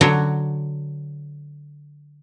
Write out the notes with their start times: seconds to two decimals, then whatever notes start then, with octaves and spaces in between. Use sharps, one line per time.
0.01 D3 F#3 F#4 C#5